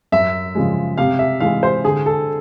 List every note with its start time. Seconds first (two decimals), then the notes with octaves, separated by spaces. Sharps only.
0.12 F#2 E5
0.55 C#3 F3 G#3
0.98 C3 F5
1.19 E5
1.40 E3 G#3 F5
1.63 C5
1.84 D3 G#4
2.06 A4